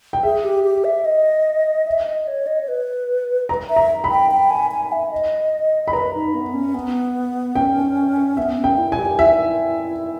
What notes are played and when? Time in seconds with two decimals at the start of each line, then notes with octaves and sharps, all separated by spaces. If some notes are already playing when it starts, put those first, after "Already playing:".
0.13 G5
0.23 G#4 E5
0.44 G4
0.64 G4
0.84 E5
1.05 D#5
1.87 E5
2.07 D#5
2.27 C#5
2.47 D#5
2.61 C#5
2.68 B4
3.49 A#5
3.70 E5
3.76 A#5
4.04 B5
4.10 G5
4.31 G5
4.50 G#5
4.71 G#5
4.92 E5
5.11 D#5
5.88 B5
5.93 B4 A#5
6.14 D#4
6.34 B3
6.54 C#4
6.74 B3
7.55 C#4 G5
8.37 B3 E5
8.58 C#4
8.64 G5
8.78 E4
8.92 G#5
8.98 G4
9.19 E4 E5